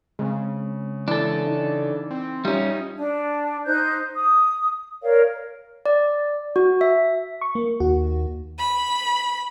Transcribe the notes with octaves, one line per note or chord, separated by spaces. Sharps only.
C#3 G#3 C4
E3 D4 A4
D#4
C4
G3 C#4 D#4 F4 G4 E5
D4
D#4 C5 F#6 G6
D#6
A#4 C#5 D5 F5
D5
F#4
E5
C#6
A#3
D#2 F#4
B5